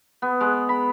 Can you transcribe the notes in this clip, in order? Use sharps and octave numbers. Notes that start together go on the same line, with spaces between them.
B3
G#3
B5